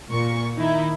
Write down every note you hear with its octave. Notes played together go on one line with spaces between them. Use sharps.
A#2 A#3 C#6
D#3 D#4 E4